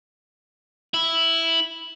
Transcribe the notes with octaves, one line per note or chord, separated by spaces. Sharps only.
E4